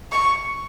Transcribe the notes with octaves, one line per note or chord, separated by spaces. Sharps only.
C#6